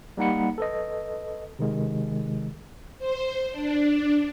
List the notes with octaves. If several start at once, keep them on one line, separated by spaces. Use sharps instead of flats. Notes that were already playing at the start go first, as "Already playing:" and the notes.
G3 A#3 D#4 F#5 B5 C#7
A4 B4 D#5
C3 D#3 G#3
C5
D4